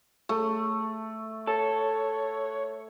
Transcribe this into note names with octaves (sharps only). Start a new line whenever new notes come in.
A3
A4 C#5